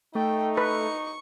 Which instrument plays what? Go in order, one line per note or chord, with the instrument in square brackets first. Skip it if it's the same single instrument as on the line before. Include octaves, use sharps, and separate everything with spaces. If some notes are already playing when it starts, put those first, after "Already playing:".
[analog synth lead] A3 [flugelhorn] D#4 [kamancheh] G5
[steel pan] B4 [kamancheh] C#6